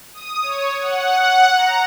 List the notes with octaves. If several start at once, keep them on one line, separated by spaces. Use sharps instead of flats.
D#6
C#5
F#5
A#5